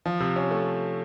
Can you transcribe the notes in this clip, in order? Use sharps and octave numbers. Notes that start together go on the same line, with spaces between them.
F3
C3
C#4
A3